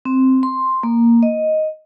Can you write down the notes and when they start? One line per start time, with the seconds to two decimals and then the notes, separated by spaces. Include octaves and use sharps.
0.05 C4
0.43 C6
0.83 A#3
1.23 D#5